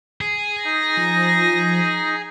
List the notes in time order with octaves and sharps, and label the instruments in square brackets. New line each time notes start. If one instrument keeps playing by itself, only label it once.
[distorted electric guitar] G#4
[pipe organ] D#4 [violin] A#6
[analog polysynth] F3